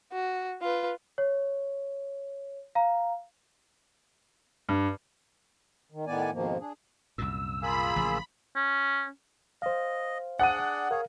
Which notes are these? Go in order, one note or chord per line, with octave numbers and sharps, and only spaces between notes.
F#4
F4 B4
C#5
F5 A#5
G2
D#3
A2 D#3 B3 D5 G#5
F2 G#2 B2 D#3 F3 A#3
D4 G#4
C2 F#2 A#2 E6
A#3 F4 G#4 B5
A1 C#3 F3
C#4
C5 D#5 F5
D4 G#4 D5 F#5 D#7
G#4 A#4 C#5 F5